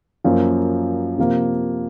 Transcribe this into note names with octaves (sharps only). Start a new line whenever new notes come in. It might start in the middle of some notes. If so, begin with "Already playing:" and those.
F#2 F3 A#3
C3 F3 A#3